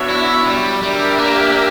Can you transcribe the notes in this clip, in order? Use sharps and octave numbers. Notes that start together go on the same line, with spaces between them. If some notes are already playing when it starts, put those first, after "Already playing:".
Already playing: B3 D4 F#4 C#5 E5
E4
G3
G3 D4 G4 A#4 E5
A#3